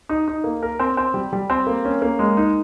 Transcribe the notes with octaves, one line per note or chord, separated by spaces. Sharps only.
D#4
D#4
A#3
A#4
C4
C4
G3
G3
C4
A#3
C#4
A#3
G#3
D#4